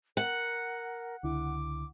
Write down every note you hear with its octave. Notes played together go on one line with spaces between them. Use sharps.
A#4 F#5
C#2 D3 E4 D6